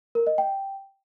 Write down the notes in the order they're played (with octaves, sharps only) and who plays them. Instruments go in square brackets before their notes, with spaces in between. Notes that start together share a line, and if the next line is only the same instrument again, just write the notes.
[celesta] A#4
D#5
G5